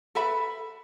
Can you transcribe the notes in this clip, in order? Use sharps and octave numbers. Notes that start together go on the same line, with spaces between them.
A4 B4 E5 B5